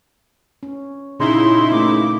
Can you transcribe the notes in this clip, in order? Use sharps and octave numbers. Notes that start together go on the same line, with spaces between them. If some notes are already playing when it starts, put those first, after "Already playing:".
C#4
A#2 C#3 D#4 E4 C6
A3 A#3 D6